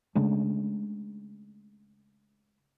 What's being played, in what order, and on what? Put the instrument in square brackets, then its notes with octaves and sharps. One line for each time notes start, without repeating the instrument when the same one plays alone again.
[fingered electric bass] C#3 G#3 A3 D4